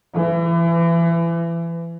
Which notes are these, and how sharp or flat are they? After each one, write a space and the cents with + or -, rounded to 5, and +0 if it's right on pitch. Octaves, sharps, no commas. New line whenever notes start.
E3 +30